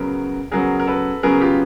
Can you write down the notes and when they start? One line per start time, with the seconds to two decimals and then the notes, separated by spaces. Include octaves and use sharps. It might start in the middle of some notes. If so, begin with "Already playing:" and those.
Already playing: C#3 F#3 B3 A#4
0.52 C#3 F#3 B3 G#4 A#4
0.80 A#4
0.87 A4 B4
1.23 C#3 F#3 B3 G#4 A#4
1.41 F4 G4